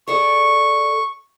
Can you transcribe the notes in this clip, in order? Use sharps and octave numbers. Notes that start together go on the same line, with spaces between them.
G#4 A4 D5 C#6